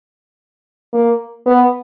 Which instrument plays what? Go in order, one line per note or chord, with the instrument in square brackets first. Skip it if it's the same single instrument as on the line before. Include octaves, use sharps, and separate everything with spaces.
[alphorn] A#3
B3